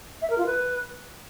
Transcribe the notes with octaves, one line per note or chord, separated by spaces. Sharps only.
E5
A#4
F4
B4